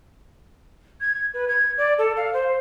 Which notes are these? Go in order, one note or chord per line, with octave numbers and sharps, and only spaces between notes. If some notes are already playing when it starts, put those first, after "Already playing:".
G#6
B4
G#6
D5
A4
F5
C5